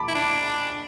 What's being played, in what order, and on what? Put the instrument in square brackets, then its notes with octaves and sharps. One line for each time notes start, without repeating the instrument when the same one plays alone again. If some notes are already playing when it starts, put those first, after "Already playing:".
Already playing: [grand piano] A5 B5 D6
[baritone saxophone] E4
D4